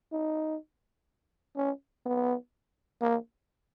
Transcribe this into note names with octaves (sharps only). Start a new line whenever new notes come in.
D#4
C#4
B3
A#3